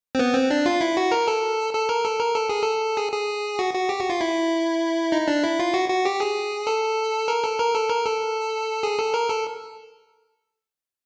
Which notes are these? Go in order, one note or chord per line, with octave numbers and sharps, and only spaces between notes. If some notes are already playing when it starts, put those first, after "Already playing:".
C4
B3
C4
D4
F4
E4
F#4
A#4
A4
A4
A#4
A4
A#4
A4
G#4
A4
G#4
G#4
F#4
F#4
G4
F#4
F4
E4
D#4
D4
E4
F4
F#4
F#4
G4
G#4
A4
A#4
A4
A#4
A4
A#4
A4
G#4
A4
A#4
A4